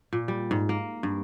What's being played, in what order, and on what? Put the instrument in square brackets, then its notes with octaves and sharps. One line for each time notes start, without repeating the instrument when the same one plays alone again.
[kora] A#2
G3
G#2
A#3
G2